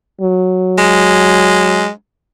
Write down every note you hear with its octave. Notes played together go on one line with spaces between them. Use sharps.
F#3
G#3